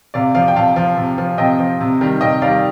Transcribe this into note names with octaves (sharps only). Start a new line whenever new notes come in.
C3 D5 F5
F3 D5 F5
G5
C3 F5 A5
F3
C3
F3
C3 D#5 G5
F3
C3
D#3 G3
C3 D#5 G5
D#3 G3 D5 F5